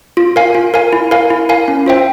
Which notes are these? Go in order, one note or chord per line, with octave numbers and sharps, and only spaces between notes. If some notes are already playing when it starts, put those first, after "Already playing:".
F4
A#4 F5 G#5
F4
A#4 F5 G#5
E4
A#4 F5 G#5
E4
A#4 F5 G#5
C#4
F4 C5 E5 G5